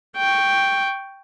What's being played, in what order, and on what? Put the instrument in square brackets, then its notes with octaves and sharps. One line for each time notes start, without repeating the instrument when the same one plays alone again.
[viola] G5 C#6